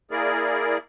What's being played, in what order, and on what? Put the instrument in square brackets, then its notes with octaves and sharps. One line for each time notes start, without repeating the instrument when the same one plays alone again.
[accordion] A#3 E4 G#4 A#4 D5